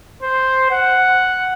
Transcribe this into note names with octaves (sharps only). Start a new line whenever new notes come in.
C5
F#5